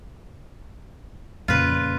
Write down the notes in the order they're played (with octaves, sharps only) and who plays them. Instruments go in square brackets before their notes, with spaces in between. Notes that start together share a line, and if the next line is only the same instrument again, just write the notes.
[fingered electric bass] F2 A#2 C#3 [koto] F4 B4